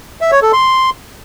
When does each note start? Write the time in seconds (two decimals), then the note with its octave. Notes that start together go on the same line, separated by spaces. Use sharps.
0.21 E5
0.32 C#5
0.42 A4
0.53 C6